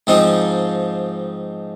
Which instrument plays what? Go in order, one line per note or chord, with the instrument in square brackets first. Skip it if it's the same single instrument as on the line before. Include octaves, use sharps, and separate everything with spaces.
[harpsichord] G#2 F3 C4 D#4